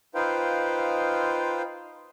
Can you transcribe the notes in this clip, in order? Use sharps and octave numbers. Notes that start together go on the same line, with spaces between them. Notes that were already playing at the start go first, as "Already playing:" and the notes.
D#4 F4 B4 C5 F5 G5